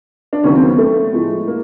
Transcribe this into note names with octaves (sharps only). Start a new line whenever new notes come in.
D4
D#2 C#3 F#3 C#4
C4
B3
A3
A2 F3 G#3
A#3